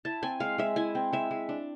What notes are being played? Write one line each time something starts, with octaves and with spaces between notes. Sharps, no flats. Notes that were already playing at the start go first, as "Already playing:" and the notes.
E4 A5
C4 G#5
G#3 F5
G#3 E5
E4 G#5
C4
G#3 E5
G#3
D4